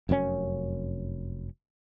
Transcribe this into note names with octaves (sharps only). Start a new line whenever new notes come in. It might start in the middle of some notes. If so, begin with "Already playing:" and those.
F1 F#2 A#2 C#4